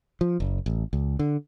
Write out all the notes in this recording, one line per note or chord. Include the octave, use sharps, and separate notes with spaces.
F3
F#1
A1
C#2
D3